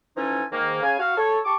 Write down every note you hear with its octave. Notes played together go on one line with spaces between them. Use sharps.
E3 F3 C#4 D#4 A4 G#5
G#2 D#3 A#3
C#3 F5 G#5
F#4 F5
A4 C#5
G4 A5 C#6 D6